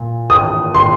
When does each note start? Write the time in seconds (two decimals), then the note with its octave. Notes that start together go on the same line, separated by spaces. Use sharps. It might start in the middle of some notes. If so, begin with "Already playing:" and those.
Already playing: A#2
0.30 D#6
0.74 C6